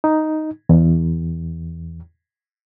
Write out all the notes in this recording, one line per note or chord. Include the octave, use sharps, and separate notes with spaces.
D#4
E2